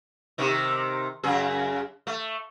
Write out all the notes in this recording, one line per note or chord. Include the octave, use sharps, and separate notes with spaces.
C3 D#3 D#4
F#2 C#3 G#4
A3